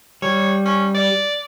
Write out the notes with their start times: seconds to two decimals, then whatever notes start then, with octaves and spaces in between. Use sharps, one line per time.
0.22 G3 C#5
0.66 C#4
0.95 D5